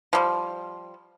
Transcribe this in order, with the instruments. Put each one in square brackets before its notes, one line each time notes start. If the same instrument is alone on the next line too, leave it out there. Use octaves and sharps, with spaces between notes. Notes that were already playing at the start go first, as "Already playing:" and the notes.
[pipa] F3 G3